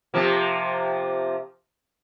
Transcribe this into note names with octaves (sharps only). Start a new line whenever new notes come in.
C3 F3 A#3